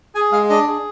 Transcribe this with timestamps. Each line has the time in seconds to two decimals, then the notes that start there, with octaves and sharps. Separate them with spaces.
0.15 G#4 G#5
0.32 G#3 F5
0.49 D4 D#5
0.68 G#4